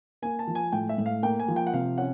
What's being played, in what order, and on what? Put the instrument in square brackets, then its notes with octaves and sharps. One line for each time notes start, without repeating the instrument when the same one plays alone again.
[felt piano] A#3 [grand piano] G#5
[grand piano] A5
[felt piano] F3
[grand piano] G#5
[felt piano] A2 [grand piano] G5
[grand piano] E5
[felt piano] A2
[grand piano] F5
[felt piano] A#3 [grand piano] G5
[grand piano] G#5
[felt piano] F3
[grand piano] G5
F#5
[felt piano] C3 [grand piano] F5
[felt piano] C#4 [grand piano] F#5